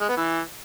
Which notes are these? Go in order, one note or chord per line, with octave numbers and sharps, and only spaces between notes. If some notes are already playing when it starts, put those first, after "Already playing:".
G#3
B3
E3